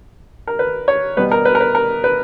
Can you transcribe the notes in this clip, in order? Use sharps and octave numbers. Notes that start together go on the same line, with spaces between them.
A#4
B4
C#5
B2 G3 B3 B4
A#4
B4
A#4
B4
A#4
B4